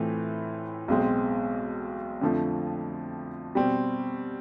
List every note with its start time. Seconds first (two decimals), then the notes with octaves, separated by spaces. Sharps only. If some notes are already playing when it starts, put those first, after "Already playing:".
Already playing: A2 E3 A3 C4 F4
0.88 B1 B2 G#3 C4
2.21 F2 D3 F3 A3
3.55 B2 G3 C4